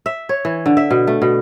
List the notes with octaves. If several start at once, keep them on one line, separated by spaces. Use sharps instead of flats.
E5
C#5
E3
D3
E5
B2
A3
B2